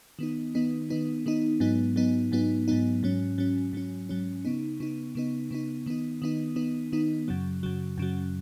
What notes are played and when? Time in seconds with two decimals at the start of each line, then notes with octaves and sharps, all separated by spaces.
0.19 D#3 B3 D#4
0.55 D#3 B3 D#4
0.90 D#3 B3 D#4
1.26 D#3 B3 D#4
1.60 G#2 F#3 B3 D#4
1.96 G#2 F#3 B3 D#4
2.32 G#2 F#3 B3 D#4
2.68 G#2 F#3 B3 D#4
3.03 G#2 F#3 C#4
3.38 G#2 F#3 C#4
3.73 G#2 F#3 C#4
4.09 G#2 F#3 C#4
4.45 C#3 B3 D#4
4.80 C#3 B3 D#4
5.15 C#3 B3 D#4
5.51 C#3 B3 D#4
5.86 D#3 B3 D#4
6.22 D#3 B3 D#4
6.56 D#3 B3 D#4
6.93 D#3 B3 D#4
7.28 F#2 C#3 F#3
7.63 F#2 C#3 F#3
7.98 F#2 C#3 F#3